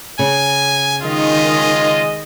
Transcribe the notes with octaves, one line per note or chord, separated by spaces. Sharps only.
C#3 G#5
D#3 G#3 F4 D#5